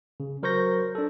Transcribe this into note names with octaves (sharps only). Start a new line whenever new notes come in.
C#3
F#3 A#4 C5 C#6 G6 A#6
D4 A4